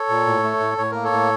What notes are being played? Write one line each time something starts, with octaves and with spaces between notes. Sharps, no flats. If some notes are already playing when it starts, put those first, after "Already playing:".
Already playing: A4 C#5
A#2
A2
A3
A2
A2 C#5
A#3 A#4
A4 C#5
A2